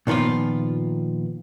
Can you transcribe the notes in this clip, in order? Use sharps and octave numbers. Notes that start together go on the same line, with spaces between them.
A#2 D#3 F3 B3 F4